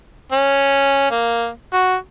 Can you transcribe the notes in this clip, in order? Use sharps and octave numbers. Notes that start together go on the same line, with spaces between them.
C#4
A#3
F#4